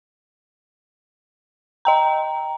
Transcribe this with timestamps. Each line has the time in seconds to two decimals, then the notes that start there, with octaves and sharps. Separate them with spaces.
1.85 D#5 G5 A#5